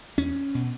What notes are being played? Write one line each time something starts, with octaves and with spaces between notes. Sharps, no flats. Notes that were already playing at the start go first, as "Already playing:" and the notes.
E2 C#4
B2